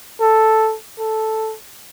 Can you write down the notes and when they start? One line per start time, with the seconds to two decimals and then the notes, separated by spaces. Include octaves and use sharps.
0.21 A4
0.99 A4